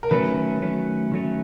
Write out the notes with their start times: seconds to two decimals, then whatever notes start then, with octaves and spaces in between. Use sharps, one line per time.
0.03 A#4
0.11 D#3 F#3 A3 C#4 B4
0.62 D#3 F#3 A3 C#4
1.12 D#3 F#3 A3 C#4